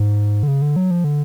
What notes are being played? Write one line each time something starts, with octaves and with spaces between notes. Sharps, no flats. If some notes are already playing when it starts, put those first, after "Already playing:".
Already playing: G#2
D3
C#3
D3
F#3
F3
D3